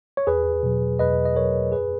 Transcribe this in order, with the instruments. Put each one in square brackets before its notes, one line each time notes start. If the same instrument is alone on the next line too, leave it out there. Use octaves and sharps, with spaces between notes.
[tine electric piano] C#5
E2 G#4 B4
B2 F#3
E2 B4 D#5
D#5
B2 F#3 A#4 C#5
F#2 G#4 B4